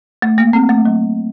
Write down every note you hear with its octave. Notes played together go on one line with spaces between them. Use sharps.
A3
A#3
C4
A3
F#3